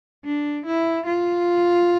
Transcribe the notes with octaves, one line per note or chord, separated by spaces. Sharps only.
D4
E4
F4